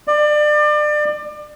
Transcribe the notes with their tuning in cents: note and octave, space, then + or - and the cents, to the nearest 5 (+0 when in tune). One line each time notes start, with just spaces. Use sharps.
D5 +30